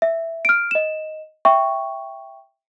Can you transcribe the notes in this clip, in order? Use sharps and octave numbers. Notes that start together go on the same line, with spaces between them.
E5
F6 D7
D#5 E7
E5 G5 C#6